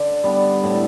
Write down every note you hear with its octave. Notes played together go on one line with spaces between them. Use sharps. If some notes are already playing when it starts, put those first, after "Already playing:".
Already playing: D3 D5
G3 B3 D4
A2